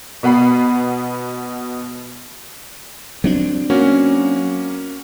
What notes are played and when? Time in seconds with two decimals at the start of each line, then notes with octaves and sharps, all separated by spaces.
0.23 B2 B3 F#5 B5 C7
3.24 F#3 C4 D4
3.70 A#3 C#4 F#4